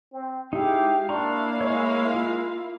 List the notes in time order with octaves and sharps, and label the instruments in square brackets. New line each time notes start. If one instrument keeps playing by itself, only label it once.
[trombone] C4
[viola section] G#3 F5 [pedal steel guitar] D#4 E4 [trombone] G4
[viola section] A#3 E4 F5 [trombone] D4 [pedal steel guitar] A#5 C6 C#6
[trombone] G#3 [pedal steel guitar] C#5 C#6
[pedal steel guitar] F4